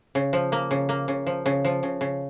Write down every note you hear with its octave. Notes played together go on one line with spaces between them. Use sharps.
C#3
F3
A#3
C#3
A#3
C#3
F3
C#3
F3
C#3
C#3